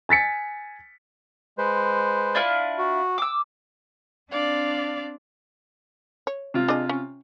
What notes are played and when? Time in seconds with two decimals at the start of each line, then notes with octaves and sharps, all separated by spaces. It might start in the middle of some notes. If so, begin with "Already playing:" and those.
0.09 G#5 A6 B6 C#7
1.58 G#3 B4 C5
2.35 D4 E4 F4
2.78 F#4
3.18 D6 E6
4.32 C4 D4 D5 F5
6.27 C#5
6.54 C3 F4
6.68 D4 G#4 D#5
6.89 C#4